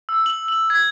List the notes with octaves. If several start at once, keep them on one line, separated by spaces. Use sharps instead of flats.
E6
F#7
F#7
G#6